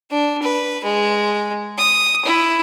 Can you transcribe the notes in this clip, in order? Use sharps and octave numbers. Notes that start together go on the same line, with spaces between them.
D4
B4
G#3
D#6
E4